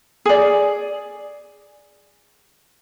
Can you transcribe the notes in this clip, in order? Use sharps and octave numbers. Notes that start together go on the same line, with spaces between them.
G#4 D5